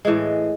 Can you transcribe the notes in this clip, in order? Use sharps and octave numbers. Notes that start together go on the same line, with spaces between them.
A2 E3 G#3